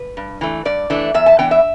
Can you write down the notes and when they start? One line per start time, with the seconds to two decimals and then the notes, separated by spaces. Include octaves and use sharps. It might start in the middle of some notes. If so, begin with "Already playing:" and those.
Already playing: B4
0.17 G2
0.41 E3 A3 D4
0.65 G2 D5
0.90 E3 A3 D4
1.14 E2 E5
1.26 A5
1.39 E3 B3 D4 G5
1.51 E5